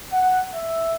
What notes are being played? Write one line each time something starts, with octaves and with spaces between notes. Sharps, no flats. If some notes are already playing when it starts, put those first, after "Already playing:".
F#5
E5